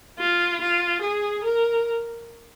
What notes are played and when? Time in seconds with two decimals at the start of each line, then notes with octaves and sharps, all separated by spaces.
0.19 F4
0.62 F4
1.02 G#4
1.44 A#4